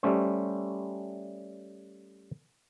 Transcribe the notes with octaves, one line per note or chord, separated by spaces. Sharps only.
G3 A3 C#4 C5